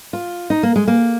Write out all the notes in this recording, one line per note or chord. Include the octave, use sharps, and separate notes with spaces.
F4
D#4
A#3
G#3
A#3